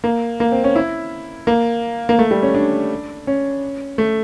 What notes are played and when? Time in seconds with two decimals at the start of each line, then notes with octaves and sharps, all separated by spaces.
0.04 A#3
0.40 A#3
0.52 C4
0.64 C#4
0.76 E4
1.47 A#3
2.09 A#3
2.19 A3
2.31 G3
2.42 C#4
2.55 D4
3.27 C#4
3.98 A3